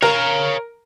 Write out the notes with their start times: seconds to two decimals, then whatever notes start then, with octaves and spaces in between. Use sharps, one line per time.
0.02 A#4 C#5 F5